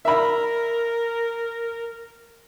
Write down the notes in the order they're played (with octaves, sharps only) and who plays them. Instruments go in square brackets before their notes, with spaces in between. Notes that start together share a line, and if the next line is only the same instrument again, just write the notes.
[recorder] A#4 [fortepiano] E5 B5